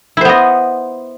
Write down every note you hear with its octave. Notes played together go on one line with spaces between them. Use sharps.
B3 E4 C5 D#5